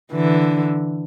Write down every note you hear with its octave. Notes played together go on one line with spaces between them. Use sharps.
D3 E3